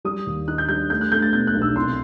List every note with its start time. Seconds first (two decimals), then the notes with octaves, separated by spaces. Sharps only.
0.05 G3 D#6
0.26 D#2
0.48 D#4 F#6
0.58 G6
0.69 G3 G6
0.90 A3 G6
1.01 F#6
1.12 A3 G6
1.22 A6
1.33 B2 G6
1.47 F#6
1.55 B1
1.62 E6
1.76 C2 C6